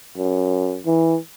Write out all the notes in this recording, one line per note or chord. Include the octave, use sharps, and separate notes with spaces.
F#2
E3